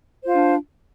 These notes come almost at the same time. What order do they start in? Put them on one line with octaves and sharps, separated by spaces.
C5 F4 F5 D4